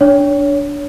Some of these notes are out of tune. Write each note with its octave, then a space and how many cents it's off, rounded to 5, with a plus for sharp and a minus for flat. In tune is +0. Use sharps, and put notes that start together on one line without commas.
D4 -10 C#5 +20